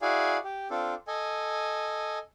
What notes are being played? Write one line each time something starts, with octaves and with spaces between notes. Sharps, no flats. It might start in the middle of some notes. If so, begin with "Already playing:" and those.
E4 F#4 G#4 D5 F5 G#5
G4
C4 D4 F4 A4
A4 D#5 G#5